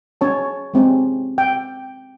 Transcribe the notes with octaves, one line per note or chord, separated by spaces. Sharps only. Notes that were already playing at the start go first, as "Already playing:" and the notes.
C#4 C#5 A5
G#3 C4 C#4
G5